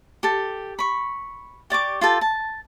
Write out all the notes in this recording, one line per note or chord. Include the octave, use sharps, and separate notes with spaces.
G4 A4
B5 C#6
G4 D5 C#6 D6
F4 G4 A4
A5